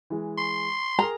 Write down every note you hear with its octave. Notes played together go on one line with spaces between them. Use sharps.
E3 G#3
C6
G#4 A#4 A#5